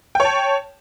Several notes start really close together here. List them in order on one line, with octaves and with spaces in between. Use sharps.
G5 C#5 A5